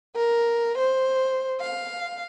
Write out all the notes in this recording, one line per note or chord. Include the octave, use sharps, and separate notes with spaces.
A#4
C5
F5